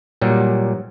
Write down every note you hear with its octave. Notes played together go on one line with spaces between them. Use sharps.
A#2 F#3 G3